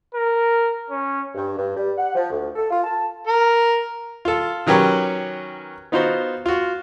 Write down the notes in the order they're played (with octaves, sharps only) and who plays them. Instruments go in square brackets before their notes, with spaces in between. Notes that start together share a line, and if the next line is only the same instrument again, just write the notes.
[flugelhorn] A#4
C#4
[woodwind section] G2
G2
G3
F#5
F3
D2
A4
F4
A5
[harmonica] A#4
[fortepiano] F4 A4
D#3 F#3 C#4 G4 B4 C#5
B3 D#4 F4 F#4 C5
F4 F#4